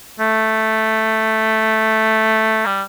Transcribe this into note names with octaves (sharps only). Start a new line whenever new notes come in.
A3
G3